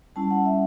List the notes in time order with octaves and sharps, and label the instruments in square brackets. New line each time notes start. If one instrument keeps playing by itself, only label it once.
[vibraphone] G3 C#4 E4 A5
F#5
E5